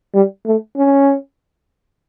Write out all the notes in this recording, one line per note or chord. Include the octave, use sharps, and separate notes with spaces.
G3
A3
C#4